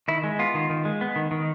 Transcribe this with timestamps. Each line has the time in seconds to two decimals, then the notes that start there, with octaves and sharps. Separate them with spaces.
0.08 D#3 E4
0.24 G#3
0.39 B3 F4
0.55 D#3
0.70 D#3
0.85 G#3
1.01 B3
1.16 D#3
1.31 D#3